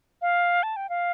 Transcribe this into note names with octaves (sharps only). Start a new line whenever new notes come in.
F5
A5
G5
F5